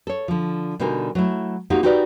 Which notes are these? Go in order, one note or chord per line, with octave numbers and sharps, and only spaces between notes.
A4 C#5
D3 F3
B2 D3 G3 D#4 A#4 G#5
F#3 A3 E4
A#3 C4 D#4 F#4 G4 F5
D#4 F#4 G4 A#4 B4 D5